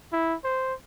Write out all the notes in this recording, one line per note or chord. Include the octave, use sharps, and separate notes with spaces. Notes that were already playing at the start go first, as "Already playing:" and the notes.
E4
C5